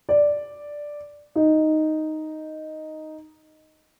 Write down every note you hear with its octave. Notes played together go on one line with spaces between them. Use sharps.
D5
D#4